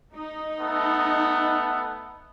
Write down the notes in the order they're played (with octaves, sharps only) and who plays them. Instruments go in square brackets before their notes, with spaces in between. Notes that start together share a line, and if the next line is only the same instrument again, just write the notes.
[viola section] D#4
[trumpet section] A3 B3